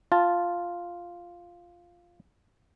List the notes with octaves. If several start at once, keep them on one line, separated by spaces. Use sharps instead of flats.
F4 A5